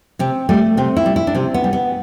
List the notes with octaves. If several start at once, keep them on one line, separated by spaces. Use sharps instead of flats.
C3 C4
G3 A3
C3 C4
E4
G3
E4
D4
C3 C4
B3
G3
B3